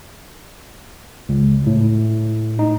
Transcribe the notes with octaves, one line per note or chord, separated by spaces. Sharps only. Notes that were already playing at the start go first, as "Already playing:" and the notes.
C#2
A2
D#4